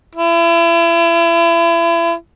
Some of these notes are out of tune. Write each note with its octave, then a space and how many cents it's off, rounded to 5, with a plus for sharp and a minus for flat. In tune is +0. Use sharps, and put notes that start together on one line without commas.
E4 +35